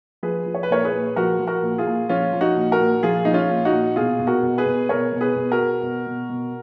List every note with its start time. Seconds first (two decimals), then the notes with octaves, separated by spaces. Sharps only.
0.23 F3 G#4 B4
0.46 F3
0.55 C#5
0.63 B4
0.70 A#2 A#4 C#5
0.85 G#4 B4
0.93 A#2
1.16 F3 F#4 A#4
1.39 F3
1.47 F#4 A#4
1.62 A#2
1.78 F4 G#4
1.87 A#2
2.09 F3 C#4 F4
2.33 F3
2.41 D#4 F#4
2.56 A#2
2.72 F#4 A#4
2.80 A#2
3.03 F3 F4 G#4
3.25 F3 D#4
3.34 C#4 F4
3.49 A#2
3.65 D#4 F#4
3.73 A#2
3.96 B2 F4 G#4
4.19 B2
4.27 F#4 A#4
4.43 B2
4.58 G#4 B4
4.66 B2
4.89 B2 A#4 C#5
5.13 B2
5.21 G#4 B4
5.36 B2
5.52 F#4 A#4
5.59 B2
5.83 B2
6.07 B2
6.29 B2